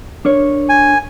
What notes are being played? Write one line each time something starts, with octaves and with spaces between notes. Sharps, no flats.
D4 A#4 C#5
G#5